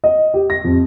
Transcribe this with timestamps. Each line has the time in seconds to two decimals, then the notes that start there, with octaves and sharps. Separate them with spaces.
0.04 D#5
0.34 G4
0.50 A#6
0.64 F2